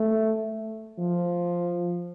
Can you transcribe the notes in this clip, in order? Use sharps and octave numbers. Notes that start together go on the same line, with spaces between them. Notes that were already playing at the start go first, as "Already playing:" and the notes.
Already playing: A3
F3